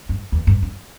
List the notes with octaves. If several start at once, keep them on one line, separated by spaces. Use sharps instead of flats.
G2
E2
G2
G2